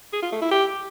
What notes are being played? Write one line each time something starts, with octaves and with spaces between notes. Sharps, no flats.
G#4
F4
A3
E4
G4